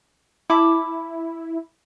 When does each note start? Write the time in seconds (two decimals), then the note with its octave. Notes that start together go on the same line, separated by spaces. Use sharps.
0.50 E4 A5 B5 D6